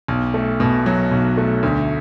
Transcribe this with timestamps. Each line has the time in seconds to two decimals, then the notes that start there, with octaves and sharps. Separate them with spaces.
0.08 B1
0.34 A3
0.60 B2
0.86 F#3
1.12 B1
1.38 A3
1.63 D2